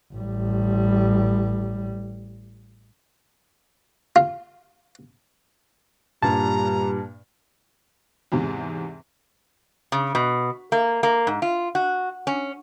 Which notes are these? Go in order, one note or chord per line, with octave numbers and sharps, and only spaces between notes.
A1 G3
F4
G2 A#2 G3 A5 A#5
E2 G#2 C3
C#3
B2
A#3
A#3
G#2
F4
F#4
C#4